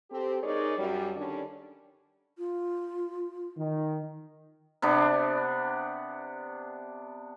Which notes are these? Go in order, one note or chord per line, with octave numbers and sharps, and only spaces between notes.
C4 G4 A4
G#3 D#4 G#4 A#4 C#5 D5
F#2 G3
D3 D#3 G3 C#4 D4 C#5
F4
D#3
C3 B3 D4